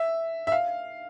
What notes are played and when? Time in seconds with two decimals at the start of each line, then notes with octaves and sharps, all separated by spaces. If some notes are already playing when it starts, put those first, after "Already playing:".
Already playing: E5
0.47 E5
0.52 F5